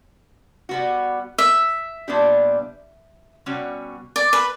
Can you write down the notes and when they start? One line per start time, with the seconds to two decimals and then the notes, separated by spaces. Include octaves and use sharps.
0.69 G3 B3 F#4
1.38 E5
2.08 A#2 G3 B3 D4 G4
3.46 B2 G3 C#4 F#4
4.16 D5
4.33 B4